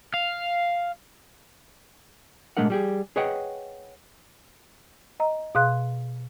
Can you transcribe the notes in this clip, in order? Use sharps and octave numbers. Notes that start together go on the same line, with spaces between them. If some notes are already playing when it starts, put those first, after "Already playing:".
F5
A#2 G#3 A3 D4 A#4 F#5
G3 G4 G#4
G#4 B4 C#5 D#5 F#5 G5
D#5 A#5
B2 G#4 F5 C6 F#6